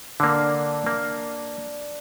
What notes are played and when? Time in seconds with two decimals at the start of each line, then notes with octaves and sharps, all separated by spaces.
0.20 D3 A#3 D4 D5
0.86 A#3